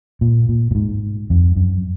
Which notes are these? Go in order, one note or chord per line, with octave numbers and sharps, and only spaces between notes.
A#2
A#2
A#2
G#2
F2
F#2